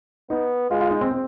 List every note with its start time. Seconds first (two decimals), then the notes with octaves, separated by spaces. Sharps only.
0.30 B3 D#4
0.70 G#3 F4
0.80 F4
0.91 D#4
1.01 C4
1.11 C4